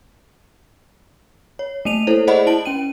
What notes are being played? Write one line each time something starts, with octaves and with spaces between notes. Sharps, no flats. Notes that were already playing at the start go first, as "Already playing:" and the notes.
C#5
A3 A#3 D#7 F7
E4 A4 C5 C#5
G#4 C5 D5 D#5 F#5 B5
E4 A5 D7 F#7
C#4 G5 D#7